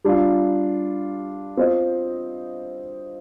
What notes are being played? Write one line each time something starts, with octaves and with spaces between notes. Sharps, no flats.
G3 D4 F4
C4 F4 C5 D#5